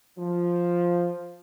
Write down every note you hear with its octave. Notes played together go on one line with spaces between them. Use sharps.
F3